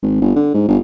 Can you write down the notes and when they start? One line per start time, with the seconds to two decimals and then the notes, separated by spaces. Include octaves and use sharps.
0.03 G#1
0.21 G1
0.36 D3
0.54 G#2
0.68 G1